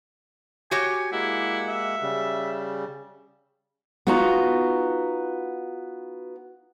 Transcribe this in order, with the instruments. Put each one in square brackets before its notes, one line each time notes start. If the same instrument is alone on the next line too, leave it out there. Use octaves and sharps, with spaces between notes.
[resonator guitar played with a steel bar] F#4 G4 C#5 [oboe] G#5
[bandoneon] G#3 A#3 F#5 [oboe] E4
[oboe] E5
[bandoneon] C#3 G3
[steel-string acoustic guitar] B3 D#4 F4 F#4 A#5